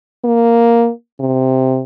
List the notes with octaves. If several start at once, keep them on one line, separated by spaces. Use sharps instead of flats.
A#3
C3